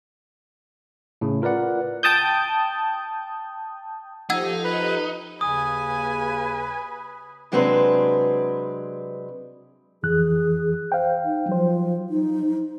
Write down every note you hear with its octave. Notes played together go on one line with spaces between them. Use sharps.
A2 C#3
F4 A#4 B4 D5 F#5
G5 A5 D#6 G6
F3 D#4 G4 A4 F#5 E6 G#6
B4
D#2 C#3 B4 G#5 D#6
C3 F#3 G#3 C4 D4 B4
F2 E3 G#4 F#6
C5 F5 G5
D#4
F3 F#3 C5
D#4